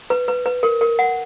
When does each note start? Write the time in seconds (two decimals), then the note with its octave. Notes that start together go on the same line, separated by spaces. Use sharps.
0.10 B4
0.28 B4
0.46 B4
0.63 A#4
0.81 A#4
0.99 F#5